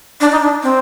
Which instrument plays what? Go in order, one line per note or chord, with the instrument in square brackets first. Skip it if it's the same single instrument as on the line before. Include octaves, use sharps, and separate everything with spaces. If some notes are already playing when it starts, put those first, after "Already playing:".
[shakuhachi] D4
D#4
D4
C4